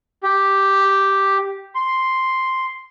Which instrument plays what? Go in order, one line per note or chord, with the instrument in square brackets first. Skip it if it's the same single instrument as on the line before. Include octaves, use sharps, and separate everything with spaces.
[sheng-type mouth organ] G4
C6